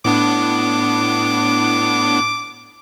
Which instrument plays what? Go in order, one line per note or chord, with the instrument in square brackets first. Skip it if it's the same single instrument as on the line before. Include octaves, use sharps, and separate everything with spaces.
[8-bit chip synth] A2 B3 D4 [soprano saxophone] D6